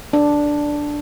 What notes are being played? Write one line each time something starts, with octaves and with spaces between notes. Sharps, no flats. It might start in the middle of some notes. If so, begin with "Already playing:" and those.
D4